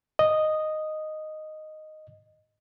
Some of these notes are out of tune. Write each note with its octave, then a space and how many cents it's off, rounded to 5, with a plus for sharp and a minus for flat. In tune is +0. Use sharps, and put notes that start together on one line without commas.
D#5 -5